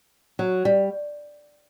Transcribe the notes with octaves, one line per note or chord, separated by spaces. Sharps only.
F#3
G3